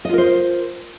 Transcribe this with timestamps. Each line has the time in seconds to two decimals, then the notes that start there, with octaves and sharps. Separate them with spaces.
0.05 D#5
0.09 F4
0.14 A#4
0.18 C5